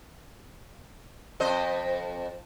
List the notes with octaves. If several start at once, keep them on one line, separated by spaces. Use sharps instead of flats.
F2 C5 D#5